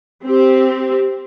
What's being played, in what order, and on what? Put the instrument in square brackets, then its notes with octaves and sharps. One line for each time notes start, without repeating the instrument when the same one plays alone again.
[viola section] C4 G4